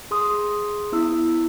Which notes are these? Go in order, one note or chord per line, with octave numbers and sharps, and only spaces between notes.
G#4 C6 D#6
B3 E4 E6